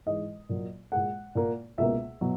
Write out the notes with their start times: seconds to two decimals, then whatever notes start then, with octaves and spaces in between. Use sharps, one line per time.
0.06 G#2 E3 G#3 D#5
0.49 A#2 F#3 A#3
0.92 A#2 G#3 F#5
1.35 A#2 A#3
1.78 C#2 B2 A#3 E5
2.21 B2 F#3